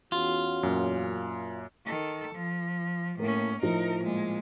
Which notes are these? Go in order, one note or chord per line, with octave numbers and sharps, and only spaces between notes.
E2 C#4 F4 F#4
F#2 A#2
D#3 A4
F3
A2 A#3 C#4 A#4
A2 F3 D#4 A#4
A#2 G#3